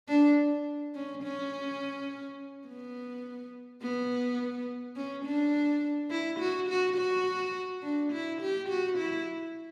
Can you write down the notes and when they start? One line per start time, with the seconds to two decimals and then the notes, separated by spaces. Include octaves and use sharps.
0.08 D4
0.95 C#4
1.23 C#4
2.67 B3
3.82 B3
4.96 C#4
5.25 D4
6.11 E4
6.39 F#4
6.69 F#4
6.97 F#4
7.83 D4
8.12 E4
8.41 G4
8.69 F#4
8.98 E4